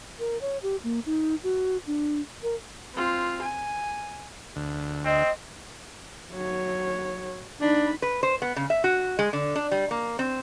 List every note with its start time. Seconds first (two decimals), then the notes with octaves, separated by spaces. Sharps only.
0.19 A#4
0.41 C#5
0.63 G4
0.84 A#3
1.06 D#4
1.44 F#4
1.87 D4
2.43 A#4
2.95 C4 F4
3.42 G#5
4.56 D2
5.05 C4 D#5
6.32 F#3 C#5
7.61 D4 D#4 B5
8.02 B4
8.23 C5
8.42 B3
8.56 C#3
8.70 E5
8.84 F#4
9.19 G#3
9.33 D3
9.55 D4
9.72 G3
9.91 A#3
10.19 C4